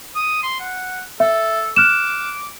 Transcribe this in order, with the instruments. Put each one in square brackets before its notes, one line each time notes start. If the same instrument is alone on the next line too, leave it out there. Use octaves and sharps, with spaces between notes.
[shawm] D#6
C6
F#5
[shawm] A4 [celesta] E5
[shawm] D6 [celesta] F6 F#6 E7